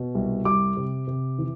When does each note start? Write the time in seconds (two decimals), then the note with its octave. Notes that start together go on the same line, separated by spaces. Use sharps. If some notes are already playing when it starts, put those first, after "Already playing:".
Already playing: B2
0.15 C2
0.45 G3 D6
0.77 C3
1.07 C3
1.38 E3